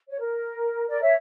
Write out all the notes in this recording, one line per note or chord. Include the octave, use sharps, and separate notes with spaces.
C#5
A#4
A#4 D5
C#5 E5